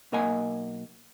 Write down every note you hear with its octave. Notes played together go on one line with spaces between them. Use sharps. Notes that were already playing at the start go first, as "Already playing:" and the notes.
B1 A#3 A#4 D#5 F#5 G#5